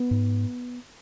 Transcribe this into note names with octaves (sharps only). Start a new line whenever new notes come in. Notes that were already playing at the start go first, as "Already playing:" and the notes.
Already playing: B3
G#2